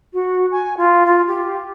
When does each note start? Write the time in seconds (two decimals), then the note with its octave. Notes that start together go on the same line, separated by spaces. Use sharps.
0.13 F#4
0.51 G#5
0.77 F4
1.05 F4
1.27 G4